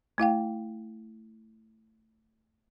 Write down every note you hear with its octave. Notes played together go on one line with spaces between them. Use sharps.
A3 E4 F5 G5